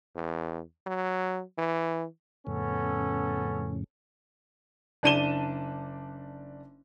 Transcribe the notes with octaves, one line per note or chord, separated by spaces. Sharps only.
E2
F#3
E3
F2 A2 C#3 B3 C#4 A4
F#1 D4 A5 D#7 E7 G7